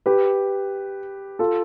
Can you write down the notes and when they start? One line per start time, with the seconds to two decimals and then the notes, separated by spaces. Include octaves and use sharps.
0.06 G4 B4
1.39 F4 A4